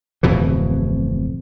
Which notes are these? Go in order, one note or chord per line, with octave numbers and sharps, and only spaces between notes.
D1 F2 B2 E3